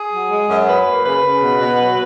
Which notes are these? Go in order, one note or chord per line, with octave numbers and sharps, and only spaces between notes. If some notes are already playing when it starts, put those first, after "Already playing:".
Already playing: G#4
F#3
G#3
F#2
F#3 B4
A#3
C#3 B4
C#3
B2
B2
F#3